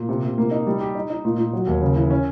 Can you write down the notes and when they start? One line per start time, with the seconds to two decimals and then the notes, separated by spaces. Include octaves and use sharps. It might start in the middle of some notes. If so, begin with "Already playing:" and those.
Already playing: A#2
0.09 C3
0.24 C3
0.38 A#3
0.51 D#4
0.67 G3
0.81 G4
0.95 D#4
1.10 D#4
1.25 A#2
1.38 A#2
1.53 F#3
1.67 D#2
1.81 C#3
1.96 E3
2.11 C#4